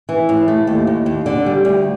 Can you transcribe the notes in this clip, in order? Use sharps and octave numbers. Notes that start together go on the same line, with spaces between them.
E3
A2
A3
D#2
D#2
D#2
D3
G3
D2